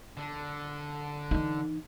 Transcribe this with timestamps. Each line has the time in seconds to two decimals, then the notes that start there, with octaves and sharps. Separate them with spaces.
0.17 D3
1.31 E3 D#4